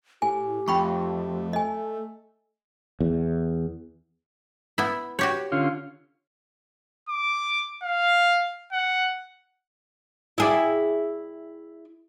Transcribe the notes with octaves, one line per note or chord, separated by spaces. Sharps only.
A2 G4 G#5
F2 A3 G5 B5 C#6
A4 D#5 G#5
E2
B3 E4
F#4 G4 C#5
D3 C#4 F4
D6
F5
F#5
E4 G#4 D5